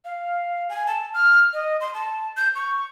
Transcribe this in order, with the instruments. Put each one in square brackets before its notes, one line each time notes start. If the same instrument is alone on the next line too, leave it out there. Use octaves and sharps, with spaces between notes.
[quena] F5
G#5
A5
F6
D#5
C6
A5
G6
C#6